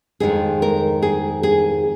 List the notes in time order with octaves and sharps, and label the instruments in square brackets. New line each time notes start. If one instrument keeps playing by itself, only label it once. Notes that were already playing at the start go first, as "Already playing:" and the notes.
[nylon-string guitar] F2 D#3 G#3 G#4
A#4
G#4
G#4